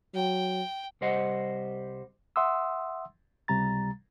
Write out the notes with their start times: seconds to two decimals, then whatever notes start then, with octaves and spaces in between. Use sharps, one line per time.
0.15 F#3 G5
1.01 C2 G3 C5 D#5 F#5
2.36 E5 F#5 C6 D#6 E6
3.48 C#2 C3 G3 A#5 A6